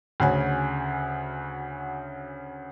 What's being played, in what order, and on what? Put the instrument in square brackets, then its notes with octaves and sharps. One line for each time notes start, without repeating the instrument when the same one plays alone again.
[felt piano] D2 C#3 C#4 F#4 G#5